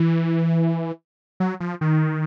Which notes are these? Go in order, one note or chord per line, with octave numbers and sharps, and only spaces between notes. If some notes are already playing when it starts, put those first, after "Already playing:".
Already playing: E3
F#3
F3
D#3